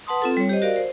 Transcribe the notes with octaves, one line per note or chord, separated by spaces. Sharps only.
B4 F#5 A5 C6 D#6
C4 F4 A4
G3 C#5
G4 C5 D#5
F#4 A#4 D5 F5
C5